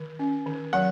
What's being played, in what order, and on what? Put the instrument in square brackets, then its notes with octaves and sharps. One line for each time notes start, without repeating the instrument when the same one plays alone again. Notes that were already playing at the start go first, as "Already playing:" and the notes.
Already playing: [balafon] D#3
C#4
D#3
[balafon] F#3 [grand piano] F#5